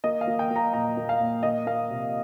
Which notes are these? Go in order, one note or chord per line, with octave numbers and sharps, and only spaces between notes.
A#3 D#5
F5
A#3
G5
A#3
A#5
A#2 A#5
A#3
F5
A#2
A#3 D#5
A#3 F5
C3